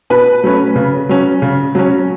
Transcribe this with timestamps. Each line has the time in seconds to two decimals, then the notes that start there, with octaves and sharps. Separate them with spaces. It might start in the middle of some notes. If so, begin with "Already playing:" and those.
0.10 B2 B4
0.44 F#3 A3 C#4
0.76 C#3
1.09 F#3 C#4
1.42 C#3
1.75 F#3 C#4